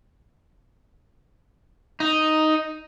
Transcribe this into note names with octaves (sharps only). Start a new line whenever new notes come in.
D#4